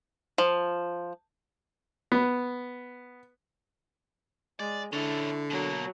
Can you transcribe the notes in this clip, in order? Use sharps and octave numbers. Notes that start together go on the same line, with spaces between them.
F3
B3
G#3 D5
D3 C#4 E4 A4
B2 F#3 A#3